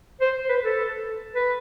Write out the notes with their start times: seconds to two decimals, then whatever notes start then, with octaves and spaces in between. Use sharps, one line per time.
0.21 C5
0.49 B4
0.64 A4
1.35 B4